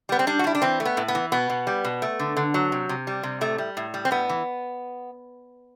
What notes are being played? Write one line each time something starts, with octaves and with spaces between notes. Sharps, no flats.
G3 B3
C4
G3 D4
F#4
G3 E4
D4
E3 C4
A3
B3
A2
B3
E3
B2 B3
B2
G3
B2
A3
D3
D3
F#3
C3
C3
G3
C3
A2 A3
G3
A2
G3
C4
A2 B3
E3